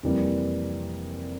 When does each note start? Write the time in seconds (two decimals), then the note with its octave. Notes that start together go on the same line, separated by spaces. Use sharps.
0.03 F2 C3 E3 G3 A#3